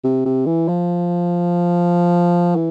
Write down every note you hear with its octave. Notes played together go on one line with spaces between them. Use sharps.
C3
C3
E3
F3
E3